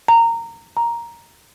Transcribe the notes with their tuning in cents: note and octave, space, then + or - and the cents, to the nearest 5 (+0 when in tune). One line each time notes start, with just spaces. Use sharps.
A#5 -20
A#5 +5